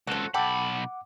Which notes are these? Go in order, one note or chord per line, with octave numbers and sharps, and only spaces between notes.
C#2 F3 F#4 A4
B1 G4 A4 F#5 B5 D6